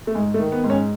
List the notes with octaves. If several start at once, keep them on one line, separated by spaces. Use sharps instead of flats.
A3
G#2 G#3
A3
D#3
B3
G#2
C#4